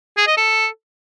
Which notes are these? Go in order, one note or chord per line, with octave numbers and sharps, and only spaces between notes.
G#4
D#5
A4